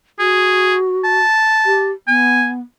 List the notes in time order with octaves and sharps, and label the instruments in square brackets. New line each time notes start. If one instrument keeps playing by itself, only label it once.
[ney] F#4 [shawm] G#4
[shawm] A5
[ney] G4
[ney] B3 [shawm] G#5